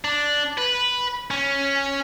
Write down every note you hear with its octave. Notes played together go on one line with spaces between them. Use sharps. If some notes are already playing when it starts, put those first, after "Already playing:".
D4
B4
C#4